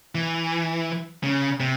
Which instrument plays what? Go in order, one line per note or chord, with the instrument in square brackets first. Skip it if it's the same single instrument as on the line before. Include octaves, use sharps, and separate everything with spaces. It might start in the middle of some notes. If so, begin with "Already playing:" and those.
[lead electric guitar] E3
C#3
C3